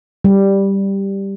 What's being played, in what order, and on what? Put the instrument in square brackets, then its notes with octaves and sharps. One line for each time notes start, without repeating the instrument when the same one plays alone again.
[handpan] G3